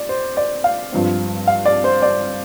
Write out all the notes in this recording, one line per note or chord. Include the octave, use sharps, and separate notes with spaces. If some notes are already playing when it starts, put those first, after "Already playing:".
Already playing: D5
C5
D5
F5
G2 F3 C4
F5
D5
C5
D5